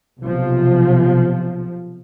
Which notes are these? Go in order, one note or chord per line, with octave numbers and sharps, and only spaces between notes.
B1 C3 F3